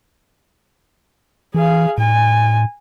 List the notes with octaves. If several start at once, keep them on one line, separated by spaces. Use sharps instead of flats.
E3 G#4 F5
A2 G#5